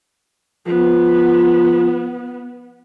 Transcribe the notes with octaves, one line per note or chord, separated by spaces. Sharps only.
F3 B3